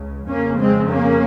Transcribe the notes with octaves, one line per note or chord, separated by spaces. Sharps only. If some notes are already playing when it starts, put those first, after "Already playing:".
Already playing: C#2 C#3
F2 C#3 A#3 C#4
G#3 C4
A#3 C#4